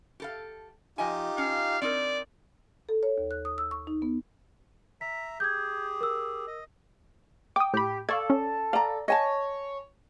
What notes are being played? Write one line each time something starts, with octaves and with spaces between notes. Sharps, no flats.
G4 A4 F5
F3 D#4 F4 G4 D#5 G#5
C#4 F5
C4 D#4 A#4 D5
A4
C#5
D#2
F#6
D#6
E6
C#6
D#4
B3
E5 A#5 B6
G4 G#4 G6 G#6
A#4 E6
D#5
G5 D6 D#6
A2 G4 B5
A4 D5 F5 C#6 G#6
C#4
D5 F5 A#5
C#5 D#5 G#5 A5